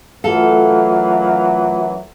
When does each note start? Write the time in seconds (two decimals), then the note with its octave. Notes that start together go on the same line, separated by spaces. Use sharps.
0.24 F#2 E3 F#3 A3 F4 A4 F5 F#5